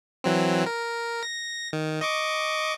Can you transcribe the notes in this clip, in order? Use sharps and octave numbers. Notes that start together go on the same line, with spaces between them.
E3 F#3 C4
A#4
A#6
D#3
D#5 C#6 D6